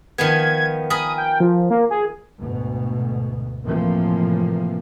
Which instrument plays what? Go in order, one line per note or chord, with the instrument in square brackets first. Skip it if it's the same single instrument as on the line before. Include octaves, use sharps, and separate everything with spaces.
[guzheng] D#3 F3 B3 [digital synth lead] G#6
[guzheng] A#4 G#5 B5 [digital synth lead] D#6
[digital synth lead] G5
F3
A#3
G#4
[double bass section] D2 G#2 B2
A2 C3 E3 F3 A#3